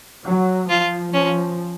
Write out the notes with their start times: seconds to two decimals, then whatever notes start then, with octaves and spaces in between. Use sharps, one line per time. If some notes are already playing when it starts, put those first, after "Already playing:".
0.25 F#3
0.69 F3 F4
1.13 F3 C#4